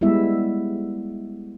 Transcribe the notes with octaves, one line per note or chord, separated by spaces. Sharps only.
G3 G#3 B3 E4 E5